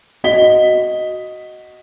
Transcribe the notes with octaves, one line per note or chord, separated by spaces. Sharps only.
F#4 D#5 B6 G7